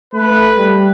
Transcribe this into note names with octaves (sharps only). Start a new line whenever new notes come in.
A3 B4
G3